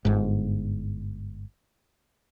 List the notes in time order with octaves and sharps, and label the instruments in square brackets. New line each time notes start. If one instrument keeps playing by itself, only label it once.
[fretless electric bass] G1 G#2